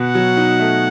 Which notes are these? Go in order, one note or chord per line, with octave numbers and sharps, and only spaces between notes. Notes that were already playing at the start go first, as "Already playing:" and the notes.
Already playing: B2 F#5
F#3
D#4
A3